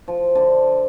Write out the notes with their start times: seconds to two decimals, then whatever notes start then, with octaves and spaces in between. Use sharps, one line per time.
0.08 F3
0.35 D3